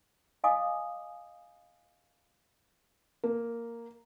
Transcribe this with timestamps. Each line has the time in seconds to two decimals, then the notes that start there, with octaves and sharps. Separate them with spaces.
0.44 D#5 F5 G#5 D6 D#6
3.24 A#3